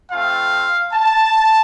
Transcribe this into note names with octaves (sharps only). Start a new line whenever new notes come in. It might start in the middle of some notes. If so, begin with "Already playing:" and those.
A3 C4 F4 F5
A5